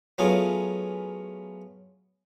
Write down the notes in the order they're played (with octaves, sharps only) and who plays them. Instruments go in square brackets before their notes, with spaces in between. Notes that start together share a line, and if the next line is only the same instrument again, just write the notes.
[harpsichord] F#3 A3 B3 C#4 F4 G#4